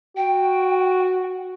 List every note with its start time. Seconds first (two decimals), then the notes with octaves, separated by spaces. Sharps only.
0.16 F#4 G5